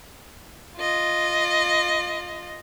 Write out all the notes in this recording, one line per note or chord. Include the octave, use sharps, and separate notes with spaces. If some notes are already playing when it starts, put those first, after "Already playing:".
F4 D#5